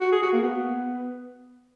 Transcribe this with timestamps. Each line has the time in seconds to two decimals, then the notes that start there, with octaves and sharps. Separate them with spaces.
0.01 F#4
0.12 G#4
0.22 F#4
0.33 A#3
0.43 B3